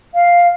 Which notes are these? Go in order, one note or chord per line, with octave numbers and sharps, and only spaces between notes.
F5